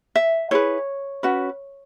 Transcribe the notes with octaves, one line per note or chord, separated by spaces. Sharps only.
E5
E4 G#4 B4 C#5
C#4 F#4 B4